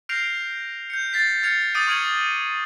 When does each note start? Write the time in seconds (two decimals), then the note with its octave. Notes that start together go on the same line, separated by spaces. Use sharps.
0.09 F6 G6 A#6 C7 D7 F7
0.90 G6 C#7
1.13 A6 B6 C7
1.43 F6 G#6 C7 C#7 F7
1.75 D6 D#6 G6 A6 D7 D#7
1.88 C#6 F6 G#6 C#7 D#7 F#7